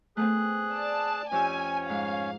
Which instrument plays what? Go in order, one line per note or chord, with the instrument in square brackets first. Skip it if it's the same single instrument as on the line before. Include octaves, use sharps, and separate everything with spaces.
[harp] A3 B3 C4 [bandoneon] G#4 F#6
[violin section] D5 A5
[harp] F2 G4 E6 [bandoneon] C#4 C#5 [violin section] G#5
[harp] G#2 [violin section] F5